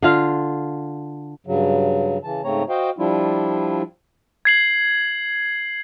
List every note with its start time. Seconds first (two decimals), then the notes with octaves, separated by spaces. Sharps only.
0.02 D3 F4 F5
1.47 G2 C#3 F#3
2.23 C#3 E3 A5
2.44 G#2 C#3 A3 C4 C#5 A#5
2.69 F#4 C5 D#5 F5 G5
2.98 F3 G3 D4 E4 F4
4.45 G#6 C7 F#7